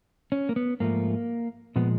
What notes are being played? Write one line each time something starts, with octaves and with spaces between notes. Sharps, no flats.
C#4
A#3
B3
G#2 F3 A3 A#3
A#2 F3 G#3 B3